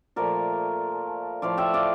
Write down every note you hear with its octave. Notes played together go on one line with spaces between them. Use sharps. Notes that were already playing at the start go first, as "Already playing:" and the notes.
A#2 F3 A3 A#4 D5
A2 F3 A3 D5 F5
E5 G5
D5 F5